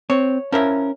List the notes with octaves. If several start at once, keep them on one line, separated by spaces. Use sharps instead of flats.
C4 C#5
F3 C#4 E4 A#4